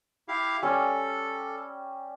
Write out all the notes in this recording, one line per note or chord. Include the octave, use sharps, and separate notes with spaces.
E4 G4 F5
G3 C#4 A4